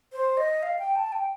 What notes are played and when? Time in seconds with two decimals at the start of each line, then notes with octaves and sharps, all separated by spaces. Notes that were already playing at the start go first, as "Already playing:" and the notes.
0.13 C5
0.37 D#5
0.63 F5
0.79 G5
0.96 A5
1.12 G5